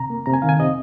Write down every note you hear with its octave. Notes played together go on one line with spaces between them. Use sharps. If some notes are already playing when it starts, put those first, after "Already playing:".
Already playing: C3 A#5
A#3
C3 A#5
G#5
D#3 F5
G#5
C3 D#5